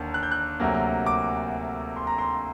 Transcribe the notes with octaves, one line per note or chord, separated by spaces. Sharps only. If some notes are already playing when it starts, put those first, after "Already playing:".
Already playing: D#2 D3 A#3
F#6
G6
F#6
D2 C3 F#3 A#3
D6
C6
A#5
C6